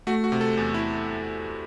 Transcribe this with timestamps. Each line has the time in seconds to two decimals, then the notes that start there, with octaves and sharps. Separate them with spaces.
0.07 A3 F#4
0.24 F#4
0.32 C3
0.41 A4
0.57 E2
0.74 E4